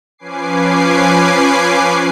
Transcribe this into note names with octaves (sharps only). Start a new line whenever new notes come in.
F3 C#4 B4 G#5 D6 C7